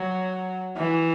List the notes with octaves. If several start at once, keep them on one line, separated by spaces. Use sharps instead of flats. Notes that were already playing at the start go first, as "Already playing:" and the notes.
Already playing: F#3
E3